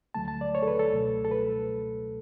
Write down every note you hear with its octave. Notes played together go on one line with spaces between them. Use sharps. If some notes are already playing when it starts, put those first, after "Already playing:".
D2 D3 F#3 A3 A5
A5
D5
C#5
A4
B4
A4
C#2 B2 F#3 A3
A4
B4